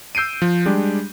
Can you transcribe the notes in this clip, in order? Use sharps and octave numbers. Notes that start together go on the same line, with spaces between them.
E6 G6 C7 D7 D#7
F3
G3 G#3 D4 G4